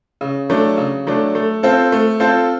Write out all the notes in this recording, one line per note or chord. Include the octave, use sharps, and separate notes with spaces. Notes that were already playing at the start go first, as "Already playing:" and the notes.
C#3
F#3 A3 D4
C#3
F#3 A3 D4
A3
C4 F4 A4 C5
A3
C4 F4 A4 C5